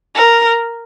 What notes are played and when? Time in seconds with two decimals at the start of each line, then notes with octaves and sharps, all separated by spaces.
0.15 A#4